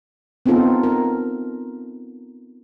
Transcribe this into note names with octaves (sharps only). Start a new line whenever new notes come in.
B3 C4 D#4 F4 A4
A#4